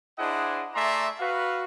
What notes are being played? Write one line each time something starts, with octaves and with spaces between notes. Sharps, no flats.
D4 E4 G#4 C5 D#5 F#5
A3 D5 E5 G#5 A#5 C6
F#4 B4 F5